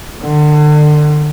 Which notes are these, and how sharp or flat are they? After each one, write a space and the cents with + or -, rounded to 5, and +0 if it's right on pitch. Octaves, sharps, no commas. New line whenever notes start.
D3 +35